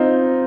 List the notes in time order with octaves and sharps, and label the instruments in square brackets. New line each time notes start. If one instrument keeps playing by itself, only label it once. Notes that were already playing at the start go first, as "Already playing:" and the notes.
Already playing: [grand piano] C4 D#4 F4